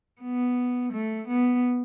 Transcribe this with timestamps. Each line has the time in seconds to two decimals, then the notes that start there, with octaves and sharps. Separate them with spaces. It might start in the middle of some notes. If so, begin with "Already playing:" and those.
0.21 B3
0.93 A3
1.28 B3